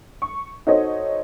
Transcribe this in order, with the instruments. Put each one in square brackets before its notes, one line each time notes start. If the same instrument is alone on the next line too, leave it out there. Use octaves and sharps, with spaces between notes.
[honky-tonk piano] C#6
D#4 F#4 A4 C5 C#5 D#5